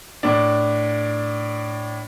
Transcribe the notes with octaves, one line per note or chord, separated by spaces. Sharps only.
A2 D4